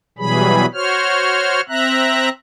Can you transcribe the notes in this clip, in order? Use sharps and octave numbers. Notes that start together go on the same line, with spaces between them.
B2 E3 F#3 G3 G#4 B5
F#4 C5 C#5 F6
C4 E5 A#5 F#6